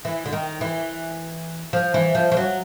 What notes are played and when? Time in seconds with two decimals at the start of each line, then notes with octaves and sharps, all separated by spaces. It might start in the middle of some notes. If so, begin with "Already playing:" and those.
0.05 E3
0.26 D3
0.32 D#3
0.61 E3
1.73 F3
1.94 E3
2.15 F3
2.32 F3
2.37 F#3